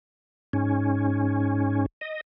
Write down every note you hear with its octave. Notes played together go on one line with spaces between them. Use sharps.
G#2 C#4
D#5